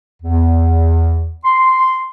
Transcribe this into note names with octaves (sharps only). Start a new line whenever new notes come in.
E2
C6